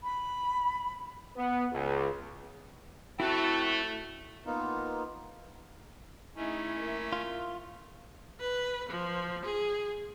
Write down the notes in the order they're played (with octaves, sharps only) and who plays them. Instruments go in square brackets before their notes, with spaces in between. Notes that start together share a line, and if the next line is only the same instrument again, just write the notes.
[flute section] B5
[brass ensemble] B3
C#2
[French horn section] A3 [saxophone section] C4 F#4 [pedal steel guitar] E4 A5
[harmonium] A#3 B3 D#4 F4
[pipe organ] A3 C#4 [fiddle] D#4 G#4 [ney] E4
[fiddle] A#3 E5
[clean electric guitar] F4
[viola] B4
F3
G#4